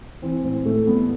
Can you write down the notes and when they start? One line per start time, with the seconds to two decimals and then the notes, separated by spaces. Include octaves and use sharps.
0.22 E3 C4
0.44 A2 C4
0.65 A2 A3
0.87 G3 B3